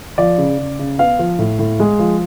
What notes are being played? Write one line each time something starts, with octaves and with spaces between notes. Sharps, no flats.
F3 D5
C#3
C#3
C#3
B3 F5
F3
A2
A2
G#3
F3